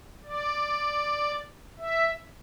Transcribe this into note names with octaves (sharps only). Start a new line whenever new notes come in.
D5
E5